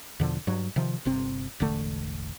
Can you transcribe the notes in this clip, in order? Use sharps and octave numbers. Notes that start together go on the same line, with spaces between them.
E2 B2 D3 F3
G2 F#3
C3 D#3 F3
G1 C3 C4
E1 A1 D3 A3